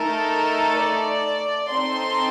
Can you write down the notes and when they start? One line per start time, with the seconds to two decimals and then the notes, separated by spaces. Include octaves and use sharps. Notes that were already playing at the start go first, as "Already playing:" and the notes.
Already playing: A3 D#4 A4 A#4
0.76 D5
1.70 C4 D#4 A4 C6